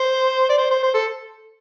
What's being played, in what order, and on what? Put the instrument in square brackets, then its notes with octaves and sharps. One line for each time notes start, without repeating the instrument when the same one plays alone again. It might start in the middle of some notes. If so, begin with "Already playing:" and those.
Already playing: [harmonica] C5
D5
C5
C5
C5
A4